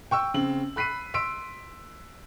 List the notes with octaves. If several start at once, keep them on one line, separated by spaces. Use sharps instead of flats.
G5 C#6 E6
C#3 C4 F#7
B5 F#6 B6 C7 D#7
C6 E6 B6 D7